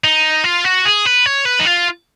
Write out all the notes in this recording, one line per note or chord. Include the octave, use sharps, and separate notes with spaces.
D#4
F4
F#4
G#4
B4
C#5
B4
D#4
F4